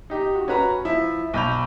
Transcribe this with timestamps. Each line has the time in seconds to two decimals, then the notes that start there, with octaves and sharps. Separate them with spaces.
0.10 D#4 G4
0.35 F#4
0.48 C#4 F#4 B4 A#5
0.85 F3 E4
1.34 B1 B5 G6 F7